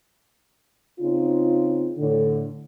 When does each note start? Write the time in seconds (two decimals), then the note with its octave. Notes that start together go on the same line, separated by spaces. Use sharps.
1.00 C#3 C4 D#4 F4
1.98 A2 D3